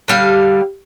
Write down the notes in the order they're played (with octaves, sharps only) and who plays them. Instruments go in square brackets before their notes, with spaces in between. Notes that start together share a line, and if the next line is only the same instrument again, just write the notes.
[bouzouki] D3 G3 F5